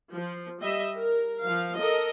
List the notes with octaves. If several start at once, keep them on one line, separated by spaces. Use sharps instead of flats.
F3
G3 D#5 E5
A#4
F3 F5
A4 A#4 D#5